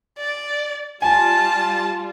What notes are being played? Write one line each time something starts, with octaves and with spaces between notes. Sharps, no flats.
D5
G3 F4 G#5 A5